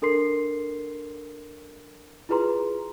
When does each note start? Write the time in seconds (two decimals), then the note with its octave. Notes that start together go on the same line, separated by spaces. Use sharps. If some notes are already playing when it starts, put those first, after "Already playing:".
0.02 D4 A4 A#4 C6 C7
2.29 E4 F4 G#4 B4 A#5 C6